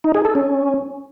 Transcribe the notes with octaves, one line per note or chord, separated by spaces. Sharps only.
D#4
G#4
A4
C#4